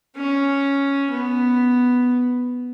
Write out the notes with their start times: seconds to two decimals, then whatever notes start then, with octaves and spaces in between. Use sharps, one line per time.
0.16 C#4
1.10 B3